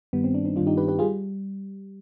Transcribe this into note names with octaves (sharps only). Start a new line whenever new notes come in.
G2 D#3 G3 B3
C4
B3 D4
C4 D#4
G2 D#3 G3 D4 F4
D#4 G4
G4 B4
G4 B4
F4 G#4
G3